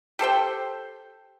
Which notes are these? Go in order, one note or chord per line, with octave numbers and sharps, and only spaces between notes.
G4 A4 C5 G5